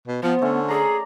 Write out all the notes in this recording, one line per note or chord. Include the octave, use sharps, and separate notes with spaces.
B2
F3 B3 C5
D3 A3 C#4
G#4 D5 A#5